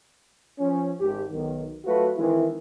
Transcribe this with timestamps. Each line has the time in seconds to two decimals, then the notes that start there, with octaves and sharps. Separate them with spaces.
0.59 F3 C#4
1.00 G#1 G4
1.31 B1 D#3
1.85 F#3 A3 F4 F#4 B4
2.17 D#3 E3 G#3 C4 E4